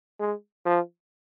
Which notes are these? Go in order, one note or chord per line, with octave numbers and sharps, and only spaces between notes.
G#3
F3